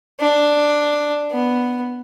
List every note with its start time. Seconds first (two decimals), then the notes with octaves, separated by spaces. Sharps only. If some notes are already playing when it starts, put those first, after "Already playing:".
0.20 D4
1.31 B3